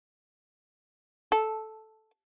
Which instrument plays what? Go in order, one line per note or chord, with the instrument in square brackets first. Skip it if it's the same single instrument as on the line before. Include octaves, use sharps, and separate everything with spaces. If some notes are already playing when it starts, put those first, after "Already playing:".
[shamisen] A4